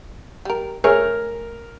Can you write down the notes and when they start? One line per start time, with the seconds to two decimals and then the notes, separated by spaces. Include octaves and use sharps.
0.45 G3 A#4
0.84 A3 G#4 A#4 C#5 F6